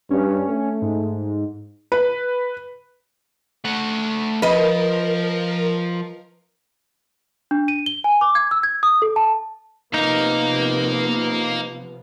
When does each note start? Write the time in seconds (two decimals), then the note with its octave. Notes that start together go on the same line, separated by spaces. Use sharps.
0.11 G2 C#4
0.49 A3
0.82 G#2
1.92 B4
3.65 A3 F#5
4.42 F3 A#4 B4 D#5
7.51 D4
7.68 D#7
7.86 G7
8.04 G#5
8.21 D6
8.35 G#6
8.51 E6
8.63 G#6
8.83 D#6
9.02 A4
9.16 A5
9.94 C3 F3 A#3 B3 D#4 F5